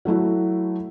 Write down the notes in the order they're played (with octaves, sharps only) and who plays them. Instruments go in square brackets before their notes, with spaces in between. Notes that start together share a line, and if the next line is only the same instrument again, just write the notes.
[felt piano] F#3 A3 E4 F#4